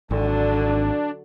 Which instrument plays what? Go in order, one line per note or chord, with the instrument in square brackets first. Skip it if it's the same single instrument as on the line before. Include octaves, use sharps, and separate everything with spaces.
[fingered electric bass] G#1 [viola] D3 F#3 [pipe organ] D4